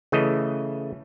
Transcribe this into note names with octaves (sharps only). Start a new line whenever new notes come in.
C#3 E3 A3 D#5